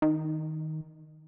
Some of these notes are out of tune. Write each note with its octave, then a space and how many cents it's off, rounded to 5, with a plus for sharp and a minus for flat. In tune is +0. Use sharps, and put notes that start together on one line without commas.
D#3 +10